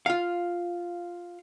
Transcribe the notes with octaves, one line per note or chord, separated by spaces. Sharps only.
F4 F5